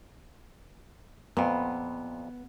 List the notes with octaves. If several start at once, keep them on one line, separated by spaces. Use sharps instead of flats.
F2 A#2 B3